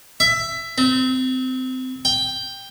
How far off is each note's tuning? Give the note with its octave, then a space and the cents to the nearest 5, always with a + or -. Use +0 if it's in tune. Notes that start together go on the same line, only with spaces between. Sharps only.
E5 +15
C4 -25
G5 +10